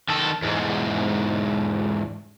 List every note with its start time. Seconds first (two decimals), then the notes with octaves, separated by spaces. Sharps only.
0.09 D#3 A4
0.42 E2 G#2